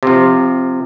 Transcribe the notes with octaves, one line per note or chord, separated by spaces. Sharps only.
C3 F3